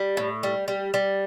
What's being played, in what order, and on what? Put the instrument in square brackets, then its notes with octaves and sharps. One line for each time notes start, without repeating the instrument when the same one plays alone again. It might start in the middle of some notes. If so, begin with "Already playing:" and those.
Already playing: [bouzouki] G3
A2
G3
G3
G3